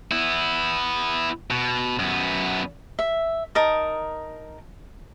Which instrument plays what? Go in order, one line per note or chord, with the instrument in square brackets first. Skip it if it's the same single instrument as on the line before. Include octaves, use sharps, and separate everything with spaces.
[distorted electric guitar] B3 E4
B2
F#2 B3
[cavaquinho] E5
D#4 A#4 A5 D#6